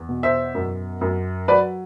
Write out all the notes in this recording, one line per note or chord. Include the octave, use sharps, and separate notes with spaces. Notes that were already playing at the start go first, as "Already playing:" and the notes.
Already playing: E2
B2
C5 E5
F#2
F#2
F#3 B4 D5